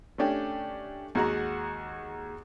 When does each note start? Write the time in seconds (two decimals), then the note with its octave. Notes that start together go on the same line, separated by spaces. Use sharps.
0.18 A3 C#4 D4 G4
1.15 D#2 G#3 F#4 F#5 A#5